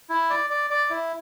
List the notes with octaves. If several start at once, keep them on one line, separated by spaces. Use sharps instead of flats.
E4
D5
D5
D5
E4